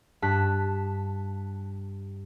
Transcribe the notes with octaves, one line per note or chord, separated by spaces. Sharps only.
G2 A5 F#6 B6